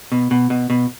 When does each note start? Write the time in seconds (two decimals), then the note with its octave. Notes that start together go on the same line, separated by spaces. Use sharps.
0.12 B2
0.31 B2
0.50 B2
0.70 B2